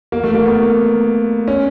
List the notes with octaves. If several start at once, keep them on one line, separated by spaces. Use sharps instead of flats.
A#3
A3
A#3
B3
C#4